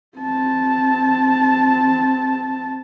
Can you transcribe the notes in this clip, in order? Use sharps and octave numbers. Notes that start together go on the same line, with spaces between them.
C4 A5